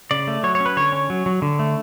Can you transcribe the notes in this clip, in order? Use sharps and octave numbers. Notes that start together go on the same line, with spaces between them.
C#3 D5
A3
F#3 C#5
C#5
C#4
B4
D3 C#5
C#4
F#3
F#3
D3
A3